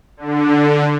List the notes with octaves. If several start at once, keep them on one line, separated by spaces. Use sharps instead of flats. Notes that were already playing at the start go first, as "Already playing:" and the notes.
D3